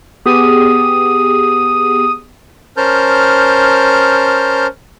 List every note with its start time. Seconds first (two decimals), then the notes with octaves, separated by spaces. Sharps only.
0.25 B3 G4 G#4 D#6
2.77 C#4 A#4 C5 A5 F6 G6